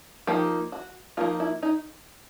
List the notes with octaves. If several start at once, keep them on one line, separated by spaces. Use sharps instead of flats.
F3 A#3 D#4 G4
F#4
F3 A#3 D#4 F4
E4
D#4